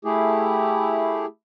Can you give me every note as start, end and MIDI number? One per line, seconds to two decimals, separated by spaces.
0.05 1.26 57
0.05 1.26 64
0.05 1.26 67
0.05 1.26 68